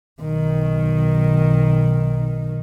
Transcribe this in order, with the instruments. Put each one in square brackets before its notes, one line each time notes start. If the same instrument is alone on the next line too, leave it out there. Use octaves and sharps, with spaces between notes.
[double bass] B1 D#3